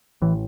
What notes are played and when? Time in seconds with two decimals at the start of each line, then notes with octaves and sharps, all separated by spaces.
0.22 A1 A2 E3